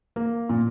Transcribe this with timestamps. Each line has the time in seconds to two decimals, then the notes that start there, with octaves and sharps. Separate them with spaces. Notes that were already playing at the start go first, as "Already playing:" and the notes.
0.16 A#3
0.49 A#2